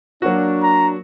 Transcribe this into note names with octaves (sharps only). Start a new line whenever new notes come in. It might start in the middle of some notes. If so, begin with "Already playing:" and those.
F#3 A#3 D4 F#4
A#5